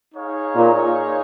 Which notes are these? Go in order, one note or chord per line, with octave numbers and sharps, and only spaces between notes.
D#4 G#4 C#5 F5
A#2